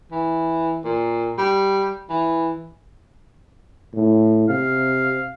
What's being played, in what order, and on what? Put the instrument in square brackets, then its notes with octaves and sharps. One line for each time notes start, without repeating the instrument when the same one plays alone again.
[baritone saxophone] E3
A#2
G3
E3
[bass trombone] A2
[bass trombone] C3 [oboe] F5